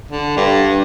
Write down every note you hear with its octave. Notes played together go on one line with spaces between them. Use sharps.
D3
G2